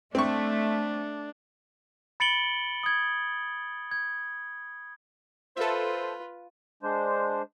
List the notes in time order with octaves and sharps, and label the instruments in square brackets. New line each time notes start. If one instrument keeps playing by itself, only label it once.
[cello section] A3 [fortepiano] C4 C#6 [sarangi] D4
[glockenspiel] B5 A6 C#7 D7 F#7 G7
D#6 G#6
G#6
[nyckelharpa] F4 B4 [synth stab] A4 E5 [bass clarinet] C5
[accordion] G#3 D4 C5